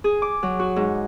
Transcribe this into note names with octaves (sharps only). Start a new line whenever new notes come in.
G#4
D6
F#3
F#4
G#2